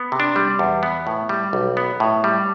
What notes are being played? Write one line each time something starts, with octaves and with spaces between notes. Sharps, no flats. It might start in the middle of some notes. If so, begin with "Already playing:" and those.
Already playing: B3
C3
D4
G3
E2
B3
A2
G3
B1
B3
A2
G3